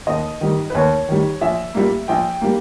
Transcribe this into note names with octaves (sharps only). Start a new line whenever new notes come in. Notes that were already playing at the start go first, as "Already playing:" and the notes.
D#2 D#5
D#3 G3
B4
D#2 C#5
D#3 G3
A#1 E5
A#2 G3 A#3
A#1 G5
G3 A#3